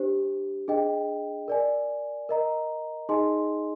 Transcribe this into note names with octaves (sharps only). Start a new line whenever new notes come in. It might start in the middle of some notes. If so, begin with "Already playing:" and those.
Already playing: D4 G4 C5
D4 G#4 D#5 G5
A#4 D5 G#5
A#4 D#5 A#5
D#4 G#4 D#5 G#5 C6